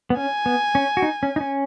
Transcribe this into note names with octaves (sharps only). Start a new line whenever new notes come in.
B3
C#4 G#5
B3
C#4
F#4
D#4
C#4
D#4
C#4